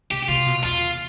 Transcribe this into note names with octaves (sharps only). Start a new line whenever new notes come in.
C3 G4
G4
C3 F4
B2
E2 F4